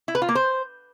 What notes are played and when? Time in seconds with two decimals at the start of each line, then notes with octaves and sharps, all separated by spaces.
0.08 E4
0.15 B4
0.22 F4
0.29 A#3
0.35 C5